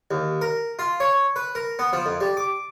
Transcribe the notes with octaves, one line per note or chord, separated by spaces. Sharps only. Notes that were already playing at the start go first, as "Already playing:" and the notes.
D#2
A#4
F4
C#5
B4
A#4
B3
F3
F2
G3
D6